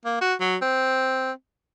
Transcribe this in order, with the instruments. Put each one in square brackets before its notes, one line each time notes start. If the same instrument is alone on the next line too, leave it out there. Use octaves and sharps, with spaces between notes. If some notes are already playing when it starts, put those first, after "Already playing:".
[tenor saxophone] A#3
F#4
F#3
C4